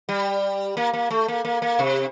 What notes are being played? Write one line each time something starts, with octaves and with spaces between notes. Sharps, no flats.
G3
A#3
A#3
A3
A#3
A#3
A#3
C3